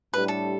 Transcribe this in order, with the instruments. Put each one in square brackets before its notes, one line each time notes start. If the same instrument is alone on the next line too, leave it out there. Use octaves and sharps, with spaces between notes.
[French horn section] A2 G3 D4 G4 [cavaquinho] B4
[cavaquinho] A4